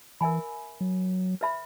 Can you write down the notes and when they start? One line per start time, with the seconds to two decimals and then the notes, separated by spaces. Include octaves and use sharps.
0.21 E3 A#4 E5 G#5 B5
0.81 F#3
1.41 B4 E5 B5